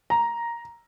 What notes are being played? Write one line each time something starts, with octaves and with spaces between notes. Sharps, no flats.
A#5